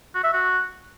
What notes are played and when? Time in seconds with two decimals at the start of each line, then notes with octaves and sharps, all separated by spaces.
0.15 F#4
0.24 E5
0.33 F#4